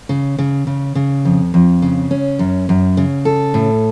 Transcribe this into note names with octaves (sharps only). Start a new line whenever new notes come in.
C#3
C#3
C#3
C#3
F2
F2
C#3
C#4
F#2
F#2
C#3
A4
A2